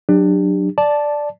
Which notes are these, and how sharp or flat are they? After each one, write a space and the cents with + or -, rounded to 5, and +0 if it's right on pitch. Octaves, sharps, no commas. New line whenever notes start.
F#3 +0 D4 +25 G4 +25
D5 +0 A5 -10